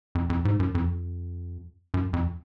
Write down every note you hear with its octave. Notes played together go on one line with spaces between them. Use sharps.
F2
F2
G#2
F#2
F2
F#2
F2